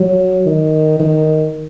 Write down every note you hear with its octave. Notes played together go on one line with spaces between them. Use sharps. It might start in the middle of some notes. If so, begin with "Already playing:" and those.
Already playing: F#3
D#3
D#3